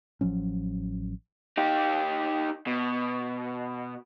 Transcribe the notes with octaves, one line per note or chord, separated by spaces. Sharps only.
A1 F3 F#3 C#4
D#4 G4
B2